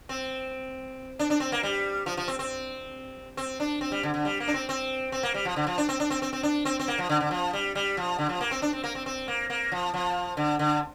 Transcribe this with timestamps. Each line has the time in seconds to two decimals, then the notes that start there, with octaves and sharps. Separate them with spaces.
0.09 C4
1.19 D4
1.30 D4
1.40 C4
1.52 A#3
1.63 G3
2.06 F3
2.17 F3
2.28 C4
2.39 C4
3.37 C4
3.60 D4
3.81 C4
3.92 G3
4.03 D3
4.14 D3
4.25 G3
4.40 A#3
4.48 D4
4.54 C4
4.69 C4
5.12 C4
5.23 A#3
5.34 G3
5.45 F3
5.56 D3
5.67 F3
5.78 D4
5.89 C4
6.00 D4
6.10 C4
6.22 C4
6.33 C4
6.43 D4
6.65 C4
6.79 C4
6.88 A#3
6.98 F3
7.09 D3
7.21 D3
7.31 F3
7.53 G3
7.75 G3
7.97 F3
8.18 D3
8.29 F3
8.41 A#3
8.51 C4
8.62 D4
8.73 C4
8.84 A#3
8.95 C4
9.06 C4
9.28 A#3
9.50 A#3
9.72 F3
9.94 F3
10.37 D3
10.59 D3